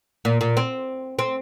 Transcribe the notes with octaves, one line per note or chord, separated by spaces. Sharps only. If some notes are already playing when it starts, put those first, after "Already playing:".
A#2
A#2
C4
C4